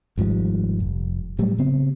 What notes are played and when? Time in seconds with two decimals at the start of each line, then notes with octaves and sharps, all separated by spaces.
0.18 G#1 G#2 F3 G3
0.80 F1
1.39 A2 F#3 G3 A3
1.58 C#3 B3 C4